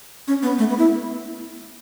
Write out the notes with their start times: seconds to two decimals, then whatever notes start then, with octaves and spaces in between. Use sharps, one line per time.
0.28 C#4
0.43 B3
0.59 A3
0.69 B3
0.78 E4